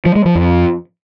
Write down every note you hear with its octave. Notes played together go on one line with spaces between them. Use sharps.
F3
G#3
F3
F2